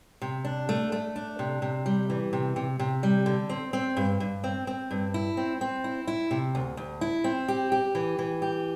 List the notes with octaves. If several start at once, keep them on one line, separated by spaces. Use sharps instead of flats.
C3
D4
A3
A3
D4
C3
C3
G3
E3
C3
C3
C3
G3
D3
C4
C4
G2
G2
C4
C4
G2
E4
C4
C4
E4
E4
C3
D2
D2
E4
C4
G4
G4
E3
E3
G4